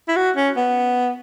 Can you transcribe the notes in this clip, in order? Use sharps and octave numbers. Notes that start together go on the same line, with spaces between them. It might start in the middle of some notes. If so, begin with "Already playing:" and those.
E4
F#4
C#4
B3